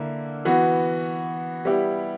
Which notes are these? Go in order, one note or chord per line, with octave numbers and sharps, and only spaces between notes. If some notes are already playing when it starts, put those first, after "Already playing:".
Already playing: D3 A#3 E4
E3 B3 F#4
G3 B3 E4 G4